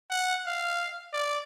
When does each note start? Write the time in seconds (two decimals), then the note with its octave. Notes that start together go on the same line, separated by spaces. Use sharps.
0.10 F#5
0.45 F5
1.13 D5